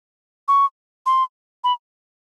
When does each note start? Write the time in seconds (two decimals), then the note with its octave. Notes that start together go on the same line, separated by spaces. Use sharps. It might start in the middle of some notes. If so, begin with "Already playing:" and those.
0.48 C#6
1.06 C6
1.64 B5